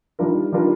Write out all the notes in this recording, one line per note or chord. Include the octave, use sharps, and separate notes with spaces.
D#3 G3 D4 F4 A#4
D#3 G3 D4 F4 A#4